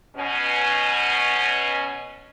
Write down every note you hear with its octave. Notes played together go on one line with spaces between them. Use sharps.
B2 C#4